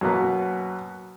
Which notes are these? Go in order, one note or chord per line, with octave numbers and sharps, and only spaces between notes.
F#2 B2 A#3 B3